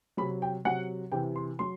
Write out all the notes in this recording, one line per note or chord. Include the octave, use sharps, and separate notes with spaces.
C3 F#3 B5
G5
C3 F#3 F#5
C3 E3 G5
C6
F#3 C6